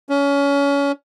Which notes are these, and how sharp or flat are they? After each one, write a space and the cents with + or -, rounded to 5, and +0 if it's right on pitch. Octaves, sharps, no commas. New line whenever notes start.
C#4 +25